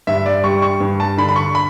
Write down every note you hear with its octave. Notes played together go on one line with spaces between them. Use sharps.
G2 E5
D5
G3 C#6
C#6
G2
A5
D3 B5
B5
C#6
B5